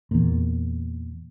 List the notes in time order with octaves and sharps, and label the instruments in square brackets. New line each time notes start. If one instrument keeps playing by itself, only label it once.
[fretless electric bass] E2 A#2